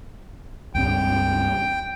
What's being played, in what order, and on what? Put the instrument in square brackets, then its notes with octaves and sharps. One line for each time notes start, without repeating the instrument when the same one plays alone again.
[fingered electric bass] C#2 G2 C4 [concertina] G5